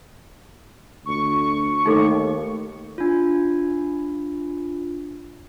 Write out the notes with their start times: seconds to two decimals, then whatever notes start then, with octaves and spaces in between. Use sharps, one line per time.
1.06 D2 C#6
1.86 D#2 A3 D#4 A4 D6
2.98 D4 F4